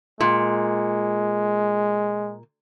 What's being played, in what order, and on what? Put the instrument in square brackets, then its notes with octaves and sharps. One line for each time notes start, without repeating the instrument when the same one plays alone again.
[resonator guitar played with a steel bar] A#2 [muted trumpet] G#3